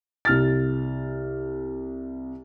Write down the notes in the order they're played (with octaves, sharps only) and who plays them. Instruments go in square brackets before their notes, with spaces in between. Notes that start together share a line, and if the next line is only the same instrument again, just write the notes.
[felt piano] C2 F6 A6